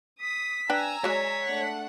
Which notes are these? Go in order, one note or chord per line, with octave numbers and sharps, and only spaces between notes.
D#6 B6
D4 B4 G5 G#5 A#5 E6
F#3 G#3 C#5 D5 B6
A3 D4 F#5